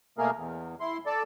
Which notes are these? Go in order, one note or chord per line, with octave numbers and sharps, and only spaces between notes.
B2 A3 A#3 G#4 A#4
E2
E4 C6
A4 D5 A5